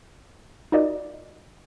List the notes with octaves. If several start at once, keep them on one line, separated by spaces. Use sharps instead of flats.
D#4 F4 F#4 A#4 D5 D#5